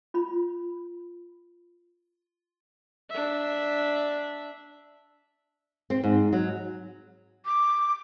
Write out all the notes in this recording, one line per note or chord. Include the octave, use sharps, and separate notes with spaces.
F4 B5
D4 E5
C4
G#2
F#3
D6